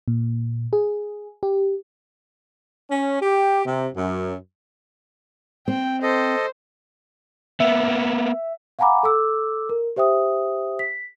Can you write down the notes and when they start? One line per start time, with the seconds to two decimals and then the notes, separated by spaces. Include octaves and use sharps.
0.08 A#2
0.73 G#4
1.43 G4
2.91 C#4
3.22 G4
3.66 C3
3.95 F#2
5.68 C4 G5
6.03 A4 C5 D#5
7.60 A#3 B3 E5
8.79 F5 F#5 G#5 A#5 B5 D6
9.03 A4 D6 E6
9.69 A#4
9.96 G4 C5 E5 G5 D#6
10.79 B6